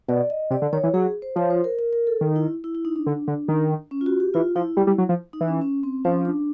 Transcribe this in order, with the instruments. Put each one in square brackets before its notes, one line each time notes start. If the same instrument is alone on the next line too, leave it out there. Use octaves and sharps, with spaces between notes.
[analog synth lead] B2 [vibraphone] D5
[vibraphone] D#5
[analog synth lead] C3 [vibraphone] D5
[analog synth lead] D3
[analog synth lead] D#3 [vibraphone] C#5
[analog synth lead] E3
[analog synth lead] F#3 [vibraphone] G#4
[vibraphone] C5
[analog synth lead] F3 [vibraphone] C#5
[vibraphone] C5
A#4
A#4
A#4
A4
[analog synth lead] D#3
[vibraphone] E4
E4
E4
D#4
D4
[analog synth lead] D3
D3
D#3
[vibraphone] C#4
F4
F#4
G4
[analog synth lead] E3 [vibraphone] F4
[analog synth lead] F3 [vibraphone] E4
[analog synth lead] G3
G3
F#3
F3
[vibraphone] D#4
[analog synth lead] E3
[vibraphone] C#4
C#4
C4
[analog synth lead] F3 [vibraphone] C#4
[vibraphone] D4